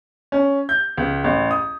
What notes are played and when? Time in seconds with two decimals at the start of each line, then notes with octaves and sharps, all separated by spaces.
0.32 C#4
0.69 G6
0.98 C#2
1.24 A1
1.51 D#6